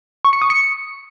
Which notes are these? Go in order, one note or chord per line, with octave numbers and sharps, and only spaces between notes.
C#6
C#7
D#6
C#7